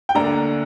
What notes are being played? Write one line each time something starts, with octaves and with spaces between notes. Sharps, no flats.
G5
D2 D3 A#3 D4 A#5